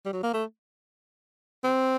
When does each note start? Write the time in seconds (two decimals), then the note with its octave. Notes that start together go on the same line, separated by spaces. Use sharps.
0.05 G3
0.13 F#3
0.23 A#3
0.34 A3
1.64 C4